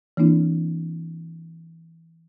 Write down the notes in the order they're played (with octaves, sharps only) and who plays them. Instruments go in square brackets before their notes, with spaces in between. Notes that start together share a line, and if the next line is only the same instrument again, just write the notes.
[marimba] E3 A#3 C4 D4 E4